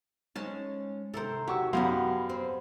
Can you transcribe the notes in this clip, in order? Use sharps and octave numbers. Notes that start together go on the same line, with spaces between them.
G#3 C#4 D#4 A5
C3 D#3 A4 A#4 C5
F#3 G4 C#6 E6
F#2 F#3 G3 B3 F5 C6
C4